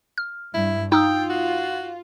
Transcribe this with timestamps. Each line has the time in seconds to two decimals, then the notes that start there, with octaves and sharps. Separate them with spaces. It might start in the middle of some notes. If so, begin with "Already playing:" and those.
0.18 F6
0.54 G2 E4
0.92 D#4 F4 G5 D#6 E6
1.30 F#4